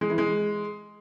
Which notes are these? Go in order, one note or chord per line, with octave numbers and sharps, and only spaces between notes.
G#3
E3
G#3